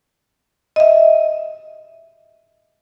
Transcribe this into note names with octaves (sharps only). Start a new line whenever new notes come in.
D#5 E5